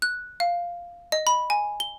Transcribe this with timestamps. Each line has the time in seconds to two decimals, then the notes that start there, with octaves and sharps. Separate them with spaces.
0.02 F#6
0.40 F5
1.12 D#5
1.27 B5
1.50 G#5
1.80 G7